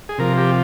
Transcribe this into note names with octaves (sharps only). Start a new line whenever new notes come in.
G#4
C3 F3 A#4
G4